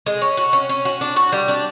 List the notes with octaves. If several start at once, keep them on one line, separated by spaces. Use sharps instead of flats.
G#3
C#4
F#4
C#4
C#4
F#4
D4
F#4
G3
D4